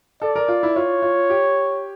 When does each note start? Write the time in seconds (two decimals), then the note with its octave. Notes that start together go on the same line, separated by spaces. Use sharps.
0.22 A4 D5
0.35 A#4
0.48 F4
0.63 E4
0.76 F4 C#5
1.02 F4
1.30 G4